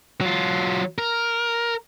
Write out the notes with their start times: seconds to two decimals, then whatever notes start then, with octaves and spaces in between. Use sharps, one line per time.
0.21 F#3 F4
0.98 A#4